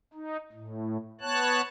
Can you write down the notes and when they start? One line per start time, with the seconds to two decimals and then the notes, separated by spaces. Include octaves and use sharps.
0.14 D#4
0.52 A2
1.21 B3 C#5 A5 F#6